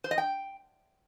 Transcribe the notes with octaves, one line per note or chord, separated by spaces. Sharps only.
C5
D#5
G5